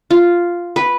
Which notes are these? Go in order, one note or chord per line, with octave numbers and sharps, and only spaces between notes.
F4
B4